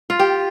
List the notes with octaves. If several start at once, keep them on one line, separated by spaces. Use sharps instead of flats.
F4
G4